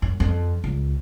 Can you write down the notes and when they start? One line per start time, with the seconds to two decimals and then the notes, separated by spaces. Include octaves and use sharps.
0.02 F#2
0.20 F2
0.64 C#2